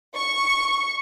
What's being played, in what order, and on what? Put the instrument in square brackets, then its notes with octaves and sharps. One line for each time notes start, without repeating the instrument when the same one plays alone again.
[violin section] C#6